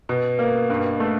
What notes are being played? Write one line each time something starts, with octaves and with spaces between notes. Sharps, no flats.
B2
A#3
G2
A3